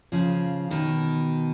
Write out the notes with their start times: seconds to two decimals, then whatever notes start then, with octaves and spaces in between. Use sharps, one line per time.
0.12 C#3 F3
0.71 B2 D#3